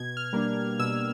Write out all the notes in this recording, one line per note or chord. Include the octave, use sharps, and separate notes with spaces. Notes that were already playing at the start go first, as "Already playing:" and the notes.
Already playing: B2 G#6
F6
G3 A#3 D4
B2 E6